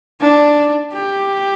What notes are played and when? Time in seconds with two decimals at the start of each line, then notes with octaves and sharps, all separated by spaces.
0.20 D4
0.93 G4